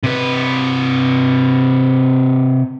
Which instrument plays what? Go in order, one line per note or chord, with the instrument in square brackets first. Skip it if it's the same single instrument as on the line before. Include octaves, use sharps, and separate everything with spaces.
[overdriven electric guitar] C3 B4